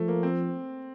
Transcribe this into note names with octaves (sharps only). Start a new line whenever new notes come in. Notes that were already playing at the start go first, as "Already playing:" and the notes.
Already playing: F3 A3
A#3
C4